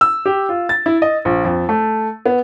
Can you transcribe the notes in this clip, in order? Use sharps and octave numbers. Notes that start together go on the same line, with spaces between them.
E6
G4
F4
A6
E4
D#5
A#1
F2
A3
B3